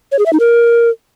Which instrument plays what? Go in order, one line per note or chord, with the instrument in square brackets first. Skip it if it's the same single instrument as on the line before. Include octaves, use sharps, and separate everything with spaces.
[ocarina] C#5
G#4
E5
D#4
A#4